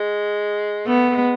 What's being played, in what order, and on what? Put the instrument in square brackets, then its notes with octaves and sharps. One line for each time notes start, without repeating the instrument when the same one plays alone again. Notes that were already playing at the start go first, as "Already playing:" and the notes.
Already playing: [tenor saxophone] G#3
[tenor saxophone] A3 [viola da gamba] B3
[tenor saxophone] A3
G#3